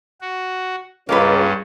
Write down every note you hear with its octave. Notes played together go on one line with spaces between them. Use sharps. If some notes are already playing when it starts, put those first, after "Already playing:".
F#4
C#2 G2 A#3 C#4 F4 B4